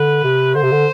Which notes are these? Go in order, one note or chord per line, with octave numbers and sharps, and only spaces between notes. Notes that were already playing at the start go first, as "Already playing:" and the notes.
Already playing: D3 B4
C3
D3 C5
C3
D3